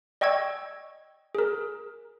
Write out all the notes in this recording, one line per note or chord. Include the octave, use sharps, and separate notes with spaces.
D5 D#5 G5 C#6 E6 G#6
G#4 A#4